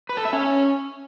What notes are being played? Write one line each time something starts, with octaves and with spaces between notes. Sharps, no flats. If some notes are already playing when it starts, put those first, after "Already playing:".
B4
A4
E5
C#4